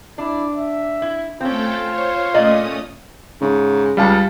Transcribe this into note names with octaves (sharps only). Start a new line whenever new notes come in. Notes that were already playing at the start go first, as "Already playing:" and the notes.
D4 E4
E5
E4
A3 C4 C#4 F4 A4 G5
C5 C#5
A#2 A3 C#4 D5 D#5 D#6
G#2 C#3
C#2 G3 F5 A5